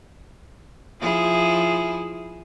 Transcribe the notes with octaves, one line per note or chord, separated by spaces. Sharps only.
F3 E4 G#4